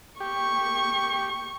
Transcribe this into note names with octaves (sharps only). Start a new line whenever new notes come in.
G4 C#6